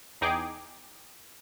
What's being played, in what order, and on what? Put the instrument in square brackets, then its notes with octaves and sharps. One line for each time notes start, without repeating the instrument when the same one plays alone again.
[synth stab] E2 D#4 G#4 G5 D6